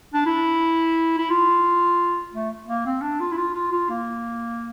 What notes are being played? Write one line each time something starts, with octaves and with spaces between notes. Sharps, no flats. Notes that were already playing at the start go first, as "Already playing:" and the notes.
D4
E4
E4
F4
A3
A#3
C4
D4
F4
E4
F4
F4
F4
A#3